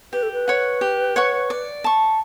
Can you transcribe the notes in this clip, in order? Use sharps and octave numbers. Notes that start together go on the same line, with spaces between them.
G4 B4
A4
B4
C#5 F#5 C#6
G4
C#5 F#5 C#6
D5
A5 C#6